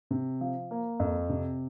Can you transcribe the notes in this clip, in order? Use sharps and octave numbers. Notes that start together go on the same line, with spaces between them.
C3
F3
A#3
F2
C3